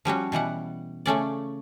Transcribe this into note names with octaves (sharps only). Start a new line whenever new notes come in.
F3 G3 C#4 F#4
B2 E3 G3 F#5
C#3 A3 C#4 D5